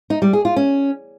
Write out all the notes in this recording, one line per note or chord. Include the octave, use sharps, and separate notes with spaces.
D#4
G3
G#4
F4
C#4